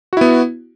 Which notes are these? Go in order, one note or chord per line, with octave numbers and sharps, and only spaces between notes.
B3 E4 F#4